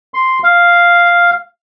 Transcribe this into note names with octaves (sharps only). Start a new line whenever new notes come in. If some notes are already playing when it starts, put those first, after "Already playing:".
C6
F5